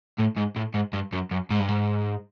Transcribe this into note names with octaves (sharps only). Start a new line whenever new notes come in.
A2
G#2
A2
G#2
G2
F#2
F#2
G#2
G2
G#2